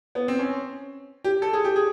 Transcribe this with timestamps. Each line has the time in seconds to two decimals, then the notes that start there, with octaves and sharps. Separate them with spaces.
0.15 B3
0.28 C4
0.39 C#4
1.24 G4
1.42 A4
1.53 G#4
1.65 G4
1.76 G#4